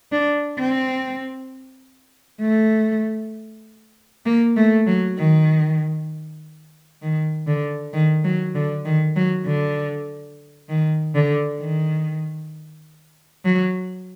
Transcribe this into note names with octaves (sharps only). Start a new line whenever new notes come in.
D4
C4
A3
A#3
A3
F#3
D#3
D#3
D3
D#3
F#3
D3
D#3
F#3
D3
D#3
D3
D#3
F#3